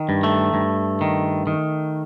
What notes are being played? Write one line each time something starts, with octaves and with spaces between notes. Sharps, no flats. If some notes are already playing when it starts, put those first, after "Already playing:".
Already playing: D#3
G2
A3
G2
D#3
D#3